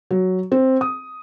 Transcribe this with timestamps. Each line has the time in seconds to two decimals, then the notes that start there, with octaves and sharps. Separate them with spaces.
0.11 F#3
0.52 C4
0.81 D#6